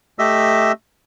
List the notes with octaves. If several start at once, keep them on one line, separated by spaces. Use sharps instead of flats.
A3 G4 D#5 E5 E6